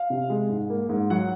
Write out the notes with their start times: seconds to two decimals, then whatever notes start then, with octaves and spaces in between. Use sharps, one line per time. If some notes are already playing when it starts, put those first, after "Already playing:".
Already playing: F5
0.10 C3
0.30 G#3
0.49 G#2
0.70 A#3
0.89 G#2
1.10 F#3 F#5